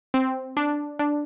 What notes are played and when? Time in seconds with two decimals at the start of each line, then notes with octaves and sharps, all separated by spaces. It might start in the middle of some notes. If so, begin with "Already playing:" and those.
0.14 C4
0.57 D4
0.99 D4